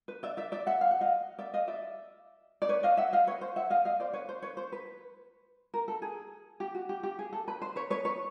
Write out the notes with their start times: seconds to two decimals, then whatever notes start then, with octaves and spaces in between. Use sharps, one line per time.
0.08 B4
0.23 D5 E5
0.37 D5 E5
0.52 D5 E5
0.67 E5 F#5
0.81 F5
0.91 F#5
1.01 D#5 F5
1.39 D5 E5
1.54 D#5 F5
1.68 D5 E5
2.62 D5
2.69 B4 C#5
2.83 D#5 F5
2.97 E5 F#5
3.13 D#5 F5
3.27 B4 C#5
3.41 C5
3.56 E5 F#5
3.70 D#5 F5
3.85 D#5 F5
4.00 C5 D5
4.13 B4 C#5
4.29 C5
4.42 B4 C#5
4.57 C5
4.72 B4
5.74 A#4
5.88 A4
6.02 G#4
6.60 G4
6.75 F#4
6.89 G4
7.03 G4
7.19 G#4
7.33 A4
7.48 B4
7.62 C5
7.76 B4 C#5
7.90 B4 C#5
8.05 B4 C#5